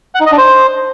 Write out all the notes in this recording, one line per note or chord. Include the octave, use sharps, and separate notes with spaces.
F#5
D#4
D#5
D4
C5